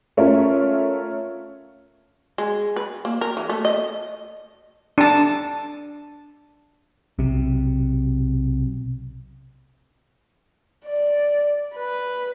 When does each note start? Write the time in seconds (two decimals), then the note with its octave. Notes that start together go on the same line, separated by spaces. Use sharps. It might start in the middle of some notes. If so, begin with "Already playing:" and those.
0.17 A3 C#4 F4 A#4
2.38 G#3
2.76 B4
3.05 A#3
3.21 A#4
3.37 E3
3.49 A3
3.65 D#5
4.98 D4 A5
7.19 B1 C3
10.86 D5
11.76 B4